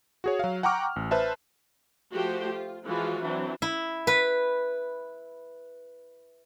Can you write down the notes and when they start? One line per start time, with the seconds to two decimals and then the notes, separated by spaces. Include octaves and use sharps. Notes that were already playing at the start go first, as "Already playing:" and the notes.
0.24 F#4 G#4 C#5
0.39 F#3 F5
0.63 F#5 G5 A#5 C#6 D6 F6
0.96 A1
1.11 B4 C5 E5 A5
2.13 F3 A3 F#4 G4 C5
2.54 F4
2.86 E3 F3 G#3 F4 F#4
3.22 E3 F#3 C4 D4
3.62 E4
4.07 B4